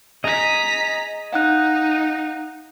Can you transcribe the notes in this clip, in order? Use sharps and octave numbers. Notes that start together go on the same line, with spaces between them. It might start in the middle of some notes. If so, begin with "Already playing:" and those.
G#4 D#5 A#5 B6
D#4 F5 F#5 F#6